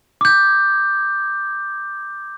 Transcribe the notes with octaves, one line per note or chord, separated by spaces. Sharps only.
D6 G6